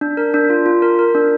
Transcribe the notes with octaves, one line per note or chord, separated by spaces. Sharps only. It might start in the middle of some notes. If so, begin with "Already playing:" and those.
D4
A#4
D4
F4
F4
A#4
A#4
D4